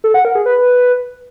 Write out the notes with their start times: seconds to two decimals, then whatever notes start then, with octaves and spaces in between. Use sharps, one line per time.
0.04 A4
0.14 F#5
0.25 A#4
0.35 G#4
0.46 B4